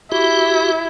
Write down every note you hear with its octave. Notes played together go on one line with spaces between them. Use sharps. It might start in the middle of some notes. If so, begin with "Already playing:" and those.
E4 F#4 G4